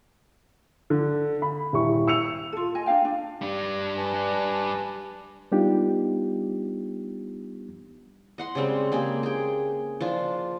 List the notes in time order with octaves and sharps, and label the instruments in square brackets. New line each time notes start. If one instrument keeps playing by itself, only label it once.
[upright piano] D3
B5
D#1 E4 C#6
E6 C#7 F7
[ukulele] F4 A4
D#5 G#5
D4 G#4 F5 G5
D4
[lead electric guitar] G3 D4
[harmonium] B4 G#5 A5
[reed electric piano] G3 B3 D4 D#4 F4 G4
[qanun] D#5 F#5 C6
C#3 G3 G#3 C4
G#3 A#3 G4 G#4
G#4 G5
F3 D4 F4